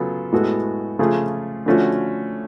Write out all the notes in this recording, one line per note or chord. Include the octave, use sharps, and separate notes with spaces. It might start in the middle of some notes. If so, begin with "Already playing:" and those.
Already playing: C#3 F#3 B3 F4 A4
A2 G#3 B3 F#4 A4
C#3 F3 A3 F4 G#4
D3 F3 A3 C#4 F#4